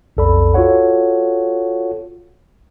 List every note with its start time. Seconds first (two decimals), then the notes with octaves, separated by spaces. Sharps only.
0.17 B1 F2 A4 D5 B5
0.54 F4 F#4 A4 C#5 F#5